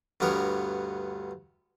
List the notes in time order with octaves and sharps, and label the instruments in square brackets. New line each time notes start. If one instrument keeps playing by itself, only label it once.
[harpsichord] D2 G2 B3 A#4 C#5